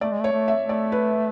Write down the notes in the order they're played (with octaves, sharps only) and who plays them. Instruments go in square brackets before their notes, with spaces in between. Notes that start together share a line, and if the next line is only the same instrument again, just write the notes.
[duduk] A3 [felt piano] D5
[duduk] G#3
A3
[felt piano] C#5
[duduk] A3
[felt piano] E5
[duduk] A3
[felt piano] D5
B4